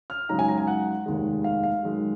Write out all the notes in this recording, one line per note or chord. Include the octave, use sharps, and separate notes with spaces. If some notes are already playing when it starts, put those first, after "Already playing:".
F6
F#2 C#3 G#3 D#4 A#5
G#5
A#5
G#5
F#5
F1 D#2 D#3 G#3
F5
F5
F#2 D#3 G#3